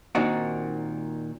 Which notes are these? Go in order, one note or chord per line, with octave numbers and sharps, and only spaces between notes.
A#2 D#3 C4 D4 D#4 F#4